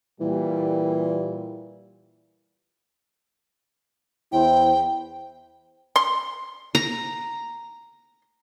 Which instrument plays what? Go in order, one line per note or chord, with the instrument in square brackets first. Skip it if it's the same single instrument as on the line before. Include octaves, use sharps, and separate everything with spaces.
[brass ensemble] A#2 G3 [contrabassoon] E3
[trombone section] E2 E4 C5 [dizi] G5
[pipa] C6
[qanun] A#5